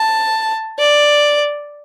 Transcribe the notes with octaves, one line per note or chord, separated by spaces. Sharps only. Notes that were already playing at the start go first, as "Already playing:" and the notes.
Already playing: A5
D5